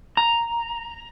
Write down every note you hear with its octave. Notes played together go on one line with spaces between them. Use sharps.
A#5